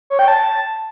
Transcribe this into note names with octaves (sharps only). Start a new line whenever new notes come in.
C#5
G5
A5